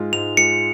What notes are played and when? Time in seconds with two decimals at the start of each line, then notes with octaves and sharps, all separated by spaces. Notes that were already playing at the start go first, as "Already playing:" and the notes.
Already playing: G#2 G#3 F4
0.13 G#2 F7
0.37 G#3 F4 C#7